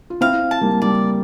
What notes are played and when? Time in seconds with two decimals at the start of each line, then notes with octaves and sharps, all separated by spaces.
0.10 F4
0.21 C4 E4 F5
0.51 A5
0.61 G3 A#3
0.82 G3 D5